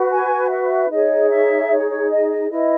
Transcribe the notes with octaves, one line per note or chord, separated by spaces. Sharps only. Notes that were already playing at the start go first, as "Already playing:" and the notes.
Already playing: F#4 B4
G#5
E5
D#4 G#4 C#5 D#5
E5
C#5
C#5
D#5
D#5
E4 B4 D#5